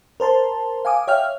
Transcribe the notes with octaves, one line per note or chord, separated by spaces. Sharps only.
A#4 C5 A5 C6
F5 G#5 D6 D#6
C#5 E5 F5 G5 F6